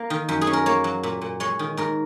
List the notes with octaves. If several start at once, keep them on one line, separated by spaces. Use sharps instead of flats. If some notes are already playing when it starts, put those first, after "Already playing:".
Already playing: A#3
D#3
F#2
G#4
C#4
A#4
A#3 C#5
F#3
A#2
A#2
G#3 C#5
D#3
G#2 A#4